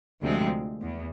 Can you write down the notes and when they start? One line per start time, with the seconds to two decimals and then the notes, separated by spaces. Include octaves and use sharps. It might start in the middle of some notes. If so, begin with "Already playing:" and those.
0.22 D2 C3 F3 G#3 C4
0.82 E2